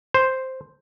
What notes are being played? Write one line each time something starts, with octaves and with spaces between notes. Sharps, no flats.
C5